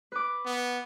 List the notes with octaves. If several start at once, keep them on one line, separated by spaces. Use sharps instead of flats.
B4 D6
B3